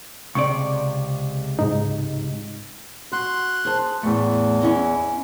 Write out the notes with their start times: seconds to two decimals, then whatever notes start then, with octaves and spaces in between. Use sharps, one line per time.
0.35 C#2 C3 D5 C#6
1.59 G#2 D#4
3.13 F#4 C6 F#6
3.65 G#4 C5 A5
4.03 E2 A2 A3
4.61 C#4 E4 D#5